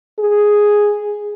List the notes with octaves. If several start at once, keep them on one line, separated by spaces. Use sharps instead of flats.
G#4